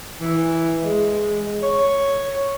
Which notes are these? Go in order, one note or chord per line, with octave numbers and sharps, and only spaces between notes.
E3
G#3
C#5